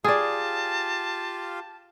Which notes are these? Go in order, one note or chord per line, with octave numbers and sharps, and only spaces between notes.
F4 G4 G#4 D5 F5 A5